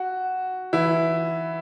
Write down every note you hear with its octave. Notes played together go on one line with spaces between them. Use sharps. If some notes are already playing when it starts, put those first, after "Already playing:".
Already playing: F#4
E3 E4